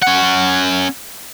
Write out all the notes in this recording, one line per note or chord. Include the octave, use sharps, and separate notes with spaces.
C#4 F#5